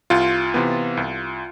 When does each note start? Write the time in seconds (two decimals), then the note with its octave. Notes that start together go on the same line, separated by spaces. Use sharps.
0.10 C2 F4
0.54 C3 E3 B3
0.97 C2